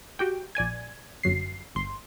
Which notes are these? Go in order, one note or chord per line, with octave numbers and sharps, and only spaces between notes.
F#4 G4 G5
A#1 D5 G#5 G#6
G1 F#2 F#3 C7
G1 C6